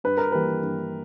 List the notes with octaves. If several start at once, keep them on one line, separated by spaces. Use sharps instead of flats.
G2 B4
A#4
E3 G3 A#3 B4
G2